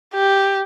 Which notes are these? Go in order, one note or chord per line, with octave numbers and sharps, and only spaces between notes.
G4